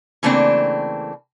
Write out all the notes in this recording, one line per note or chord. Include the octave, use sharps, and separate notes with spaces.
C#3 E3 A3 A#3 C4 D4